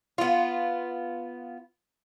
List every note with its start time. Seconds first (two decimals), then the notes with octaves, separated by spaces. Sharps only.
0.18 B3 F4